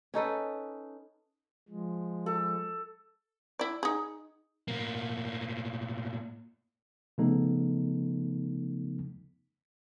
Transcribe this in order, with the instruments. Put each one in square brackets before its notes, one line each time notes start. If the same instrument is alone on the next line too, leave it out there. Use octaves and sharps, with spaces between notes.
[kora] C#4 D#4 A4 B4
[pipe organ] F3 G#3
[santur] A4
[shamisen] E4 D5
D#4 G#4
[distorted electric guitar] A2 A#3
[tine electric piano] C#3 F3 A3 B3 D#4 A4